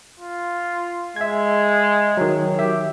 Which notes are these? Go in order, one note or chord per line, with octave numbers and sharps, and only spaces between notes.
F4
G#3 E5 G#6
D#3 F#3
G4 E5